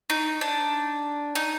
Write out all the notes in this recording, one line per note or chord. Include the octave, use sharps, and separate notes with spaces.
D#4
D4
D#4